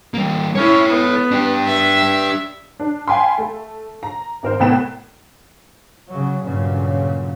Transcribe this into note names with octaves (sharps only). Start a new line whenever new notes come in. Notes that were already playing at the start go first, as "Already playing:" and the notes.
G3 A#3
C#4 E4 A4 C#5
B3
D4 G4
E5
D4
F5 G5 G#5 B5 C6
A3
A#5
G#1 A#4 C5
C2 A2 B3 G5 E7
C#3 F#3
G2 A#2 C#3 F#3